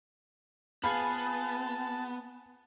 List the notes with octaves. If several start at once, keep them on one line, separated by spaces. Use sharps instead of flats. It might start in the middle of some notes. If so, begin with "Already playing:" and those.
B3 F4 G#4 G#5 A5 B5